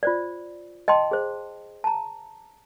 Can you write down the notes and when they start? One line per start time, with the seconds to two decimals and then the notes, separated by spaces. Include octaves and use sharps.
0.03 F4 C5 D5
0.88 D#5 G5 A5 C6
1.11 G#4 C5
1.84 A5 A#5